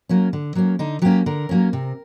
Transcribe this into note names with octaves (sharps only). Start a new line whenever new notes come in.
F#3 A#3 C#4
D3
F#3 A#3 C#4
D3 D#4
F#3 A#3 C#4 G4
D3 A#4
F#3 A#3 C#4
C3